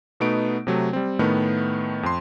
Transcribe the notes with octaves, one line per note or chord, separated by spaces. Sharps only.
B2 A3 B3 D#4 D7
C3 F#3 A3
G3 C4
A2 D#3 A3 B3
F2 C6